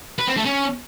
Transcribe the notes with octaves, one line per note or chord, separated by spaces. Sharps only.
B4
C4
A3
C#4